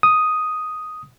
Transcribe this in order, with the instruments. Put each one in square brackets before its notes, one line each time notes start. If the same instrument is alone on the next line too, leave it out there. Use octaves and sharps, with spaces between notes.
[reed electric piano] D#6